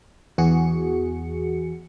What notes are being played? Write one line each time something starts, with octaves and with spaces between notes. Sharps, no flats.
E2 F#4 G#4 C#7